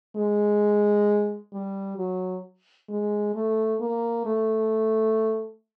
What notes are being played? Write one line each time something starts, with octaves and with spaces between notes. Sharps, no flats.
G#3
G3
F#3
G#3
A3
A#3
A3